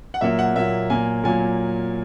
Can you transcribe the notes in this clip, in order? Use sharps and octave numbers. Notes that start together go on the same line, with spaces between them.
F#5
A#2 F#3 A#3 E5
F#5
A#2 F#3 A#3 E5
A#2 F#3 A#3 G#5
A#2 F#3 A#3 G#5